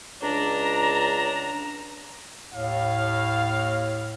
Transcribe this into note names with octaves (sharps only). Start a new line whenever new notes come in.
C#2 D4 A#5
D#2 A2 F5